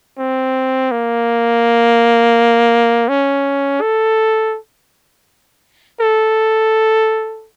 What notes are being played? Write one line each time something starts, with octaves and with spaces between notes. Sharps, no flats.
C4
A#3
C#4
A4
A4